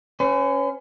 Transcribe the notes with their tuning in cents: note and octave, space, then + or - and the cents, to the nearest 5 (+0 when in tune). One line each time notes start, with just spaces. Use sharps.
C#4 +0 B4 +45